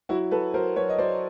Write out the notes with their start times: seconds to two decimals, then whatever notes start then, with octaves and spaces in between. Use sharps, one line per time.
0.09 F#3 E4 F#4
0.31 F#3 A4 B4
0.54 F#3 A#4 C5
0.76 F#3 B4 C#5
0.89 D#5
0.98 F#3 C5 D5